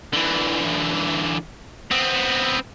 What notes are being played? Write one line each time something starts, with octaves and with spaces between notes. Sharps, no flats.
D3 E3
B3 C4